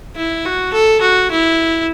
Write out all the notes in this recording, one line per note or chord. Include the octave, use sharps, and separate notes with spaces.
E4
F#4
A4
F#4
E4